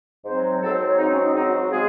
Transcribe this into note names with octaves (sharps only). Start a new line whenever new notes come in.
G#2 F#3 C4 C5
G#2 F#3 C4 A4
C5
C#5
G#2 F#3 C4 D#4
C#4
D#4
G#2 F#3 C4 D#4
F#4
F#4
C#3 G#3 G#4